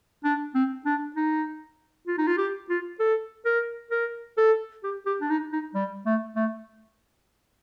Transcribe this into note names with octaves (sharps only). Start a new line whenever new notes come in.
D4
C4
D4
D#4
F4
D#4
F4
G4
F4
A4
A#4
A#4
A4
G4
G4
D4
D#4
D#4
G3
A3
A3